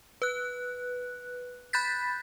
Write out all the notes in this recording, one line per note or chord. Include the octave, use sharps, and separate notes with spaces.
B4 F#6
B5 F#6 G6 A6 B6